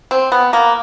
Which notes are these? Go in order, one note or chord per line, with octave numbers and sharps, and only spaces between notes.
C4
B3
A#3